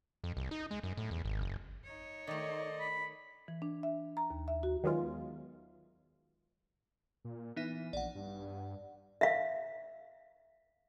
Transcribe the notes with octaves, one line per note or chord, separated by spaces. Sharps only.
F2
C2
D#4
G#3
F#2
A2
E2
G#1
F#1
D#4 C#5
D#3 A3 D5 D#5
B5
E3
D4
E5
A#5
D#2
E5
F#4
D#3 F#3 G#3 B3 F4
A#2
E3 B3 D#4 E5
A#1 D5 F#5
G2
E5 F5